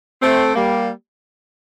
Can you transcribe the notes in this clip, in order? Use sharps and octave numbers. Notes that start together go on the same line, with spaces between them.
A3 C4
G3 A#3